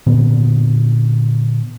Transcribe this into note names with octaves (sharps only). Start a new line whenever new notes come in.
A#2 D3 B3